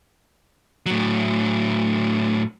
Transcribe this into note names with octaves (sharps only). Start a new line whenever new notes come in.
A2 F#3